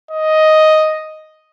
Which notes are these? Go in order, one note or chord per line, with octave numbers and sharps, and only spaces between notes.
D#5